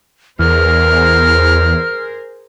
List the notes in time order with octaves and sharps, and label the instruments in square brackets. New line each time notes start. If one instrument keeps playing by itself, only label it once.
[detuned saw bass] E2 [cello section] G#4 A#4 C5 [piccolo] F6